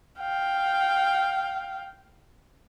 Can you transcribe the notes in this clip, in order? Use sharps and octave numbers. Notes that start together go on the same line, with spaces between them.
F5 G5